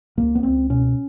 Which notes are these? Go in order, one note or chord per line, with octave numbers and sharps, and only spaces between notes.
C#2 A#3
B3
C#2 C4
B2 C#4